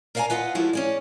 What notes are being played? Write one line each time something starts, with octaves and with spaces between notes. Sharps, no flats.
A#4 D5 F5 F#5 G#5 A#5
F4 B4 D#5 F5 F#5
F3 G3 G#3 E4 F#4 A4
C#4 G#4 D5